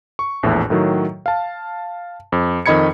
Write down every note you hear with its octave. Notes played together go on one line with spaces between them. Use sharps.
C#6
A#1 E2 A2
A2 D#3 F#3
F5 A5
F2
F2 D#3 D#5 B5 G#6 C#7